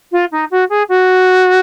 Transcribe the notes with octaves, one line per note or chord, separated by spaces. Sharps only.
F4
D#4
F#4
G#4
F#4